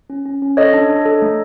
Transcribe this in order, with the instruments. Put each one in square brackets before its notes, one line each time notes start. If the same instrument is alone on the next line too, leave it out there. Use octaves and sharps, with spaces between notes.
[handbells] C#4
C#4
C#4
A4 C#5 D#5
D4
D4
A4
A3